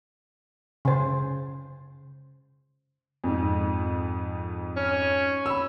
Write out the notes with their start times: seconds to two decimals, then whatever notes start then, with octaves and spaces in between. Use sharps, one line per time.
0.85 C#3 C5
3.24 F2 G#2
4.77 C#4
5.46 B5 E6